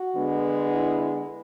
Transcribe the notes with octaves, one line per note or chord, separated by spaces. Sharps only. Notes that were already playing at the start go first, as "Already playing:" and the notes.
Already playing: F#4
D3 G#3 B3
E4